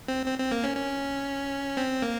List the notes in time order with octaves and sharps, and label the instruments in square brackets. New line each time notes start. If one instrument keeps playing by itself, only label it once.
[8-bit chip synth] C4
C4
C4
A#3
C#4
C#4
C4
A#3